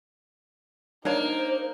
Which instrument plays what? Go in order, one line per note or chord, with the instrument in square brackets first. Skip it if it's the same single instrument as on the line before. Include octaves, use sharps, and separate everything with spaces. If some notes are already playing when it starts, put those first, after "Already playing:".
[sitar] A#3 [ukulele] D4 C#5 A#5 [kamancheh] D#4 [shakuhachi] C5